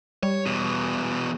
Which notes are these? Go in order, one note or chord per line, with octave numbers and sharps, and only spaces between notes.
G3 C#5
E2 B2